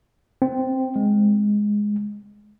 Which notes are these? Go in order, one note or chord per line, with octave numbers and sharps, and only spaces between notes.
C4
G#3